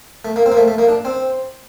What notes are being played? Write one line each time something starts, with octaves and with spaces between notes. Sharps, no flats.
A3
A#3
C4
A#3
A3
A3
A#3
D4
C4